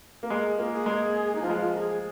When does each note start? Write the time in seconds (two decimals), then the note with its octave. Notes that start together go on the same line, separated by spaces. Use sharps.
0.23 A#3
0.30 G#3 A#4
0.44 G#4
0.58 A#3 F4
0.72 G#4
0.86 G#3
1.35 D#4
1.42 F3 F4
1.50 G#3
1.57 F3 F4
1.75 A#4
1.80 G#4